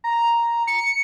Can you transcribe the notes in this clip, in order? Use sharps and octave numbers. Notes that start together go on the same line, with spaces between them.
A#5
C#7